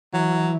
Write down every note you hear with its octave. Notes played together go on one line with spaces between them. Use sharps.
E3 F#3